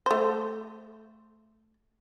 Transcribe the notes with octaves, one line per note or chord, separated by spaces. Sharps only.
A3 C5